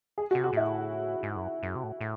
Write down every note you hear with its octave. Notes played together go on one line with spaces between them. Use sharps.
G#4
F#4
C3
F#4
A2 E4
G#2
F#2
F#2
C3
A2
A2